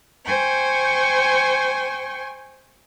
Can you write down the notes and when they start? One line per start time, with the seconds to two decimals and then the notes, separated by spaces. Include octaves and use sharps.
0.24 C5 G5 G#5 C#6